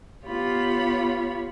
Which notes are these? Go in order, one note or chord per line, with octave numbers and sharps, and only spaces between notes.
B3 F4 G4 C#5 B5